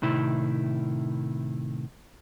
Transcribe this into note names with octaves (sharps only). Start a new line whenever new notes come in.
A2 C3 D#3 E4